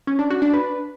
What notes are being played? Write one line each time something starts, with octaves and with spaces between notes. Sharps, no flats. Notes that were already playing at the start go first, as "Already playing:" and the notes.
C#4
D4
F#4
D4
B4